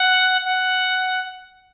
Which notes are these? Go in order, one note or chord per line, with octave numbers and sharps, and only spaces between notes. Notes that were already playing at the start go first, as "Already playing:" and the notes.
Already playing: F#5
F#5